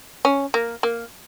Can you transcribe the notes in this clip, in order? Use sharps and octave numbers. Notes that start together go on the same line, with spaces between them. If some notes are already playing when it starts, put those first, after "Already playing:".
C#4
A#3
A#3